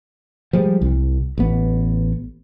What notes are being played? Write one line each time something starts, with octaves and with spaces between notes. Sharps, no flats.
F3 G3 G#3
C2
A1 B3